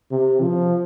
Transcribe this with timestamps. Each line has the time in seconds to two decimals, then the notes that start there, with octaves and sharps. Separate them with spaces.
0.11 C3
0.41 F3